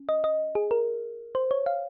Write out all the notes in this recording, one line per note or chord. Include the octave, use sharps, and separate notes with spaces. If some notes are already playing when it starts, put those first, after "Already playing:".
Already playing: C#4
D#5
D#5
G#4
A#4
C5
C#5
F5